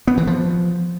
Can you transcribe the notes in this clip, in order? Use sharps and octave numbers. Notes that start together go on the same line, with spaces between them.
B3
E3
F3